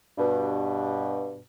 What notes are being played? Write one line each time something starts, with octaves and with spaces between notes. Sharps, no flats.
G2 B2